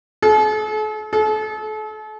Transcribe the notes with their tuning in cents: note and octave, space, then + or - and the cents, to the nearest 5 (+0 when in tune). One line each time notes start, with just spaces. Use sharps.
A4 -45
A4 -40